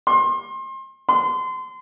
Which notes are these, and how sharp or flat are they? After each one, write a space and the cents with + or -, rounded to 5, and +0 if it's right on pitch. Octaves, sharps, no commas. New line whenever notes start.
C6 +30
C6 -30